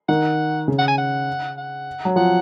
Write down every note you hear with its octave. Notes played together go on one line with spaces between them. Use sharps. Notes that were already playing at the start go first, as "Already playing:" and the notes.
D#3 F#5
C#3
F#5
G#5
F#5
F#5
F#3
F3 F#5